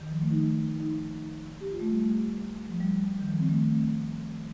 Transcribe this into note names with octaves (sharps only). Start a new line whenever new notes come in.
D#3
F3
A3
D#4
D#4
G4
F4
A3
G3
F3
G3
D#3
F3
C4
A3